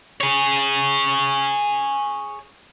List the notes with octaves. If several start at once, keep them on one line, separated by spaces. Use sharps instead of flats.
G#4 C#5